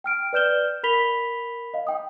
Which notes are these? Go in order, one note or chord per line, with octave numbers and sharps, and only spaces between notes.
G5 F6 D7
B4 D5 F6 G6 E7 G7
A#4 B5 B6 F7 G7
D#5 F5
G5 D#6